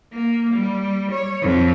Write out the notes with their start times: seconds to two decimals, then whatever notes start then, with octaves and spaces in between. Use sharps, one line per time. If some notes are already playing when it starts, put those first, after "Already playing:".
0.12 A#3
0.53 G3
1.11 C#5
1.42 F2